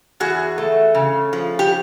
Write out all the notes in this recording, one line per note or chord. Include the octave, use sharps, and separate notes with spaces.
E2 F#4 G#4
A3
C#3
F3
G4